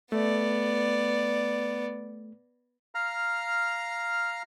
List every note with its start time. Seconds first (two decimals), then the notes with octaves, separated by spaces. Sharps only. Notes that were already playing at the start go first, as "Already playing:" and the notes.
0.12 A3 B3 D5
2.95 F5 A#5 F6